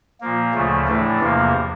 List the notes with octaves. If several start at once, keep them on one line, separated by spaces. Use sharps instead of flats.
A#2 F3 A#3
D2 C#3 F3 A3
A2 E3 A3 D4
E2 C3 F3 A#3